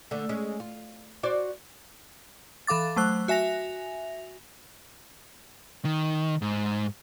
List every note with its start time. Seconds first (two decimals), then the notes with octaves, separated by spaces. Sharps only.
0.11 D3 A3
0.29 G#3 C#4
0.60 F4
1.23 F#4 C5 D5
2.67 E3 A4 F5 D6 A6
2.96 F#3 A3 C5 F#6
3.28 F#4 E5 G#5 A#6 F7
5.85 D#3
6.42 G#2